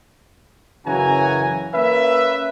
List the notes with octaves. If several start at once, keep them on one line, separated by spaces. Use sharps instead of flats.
F#2 C#3 E3 F#4 G#5 A#5
A#3 C#4 B4 E5